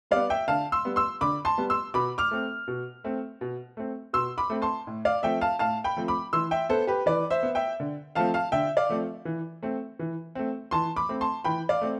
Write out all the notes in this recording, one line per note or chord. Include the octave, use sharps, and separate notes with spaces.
G3 B3 D5 F5
E5 G5
D3 F5 A5
C6 E6
G3 B3
C6 E6
D3 B5 D6
A5 C6
G3 B3
C6 E6
B2 B5 D6
D6 F6
A3 C4
B2
A3 C4
B2
A3 C4
B2 C6 E6
B5 D6
A3 C4
A5 C6
A2
D5 F5
F3 A3 C4 E5 G5
F5 A5
A2 F5 A5
G5 B5
F3 A3 C4
B5 D6
E3 C6 E6
E5 G5
B3 A4 C5
G4 B4
E3 B4 D5
C5 E5
B3
E5 G5
D3
F3 A3 C4 F5 A5
F5 A5
D3 E5 G5
D5 F5
F3 A3 C4
E3
A3 C4
E3
A3 C4
E3 A5 C6
B5 D6
A3 C4
A5 C6
E3 G5 B5
D5 F5
A3 C4